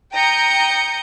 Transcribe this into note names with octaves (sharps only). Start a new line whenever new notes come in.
G5 A#5 D#6 G6 C#7